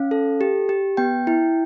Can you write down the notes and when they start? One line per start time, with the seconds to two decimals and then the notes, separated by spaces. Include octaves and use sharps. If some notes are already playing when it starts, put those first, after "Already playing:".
Already playing: C#4 F5
0.11 A4
0.41 G4
0.69 G4
0.97 B3 G5
1.27 E4